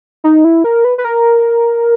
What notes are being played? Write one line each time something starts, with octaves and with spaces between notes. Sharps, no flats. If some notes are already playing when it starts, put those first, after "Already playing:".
D#4
E4
A#4
B4
B4
A#4